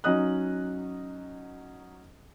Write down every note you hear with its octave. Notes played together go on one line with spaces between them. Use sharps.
F#3 C#4 D#4 D#5 D#6 F#6